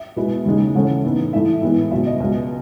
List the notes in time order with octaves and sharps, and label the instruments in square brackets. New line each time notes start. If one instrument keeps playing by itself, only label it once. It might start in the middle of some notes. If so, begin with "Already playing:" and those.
Already playing: [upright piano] E5
B2 G#3 B3 E4
D#2 C#3 G#3 D#4
C#3 E3 A3 C#4 F#5
A2 E3 B3 D#4
A2 E3 A3 E4 E5
A2 E3 G#3 B3
C#2 B2 F#3 E5
D#5
C#2 B2 G#3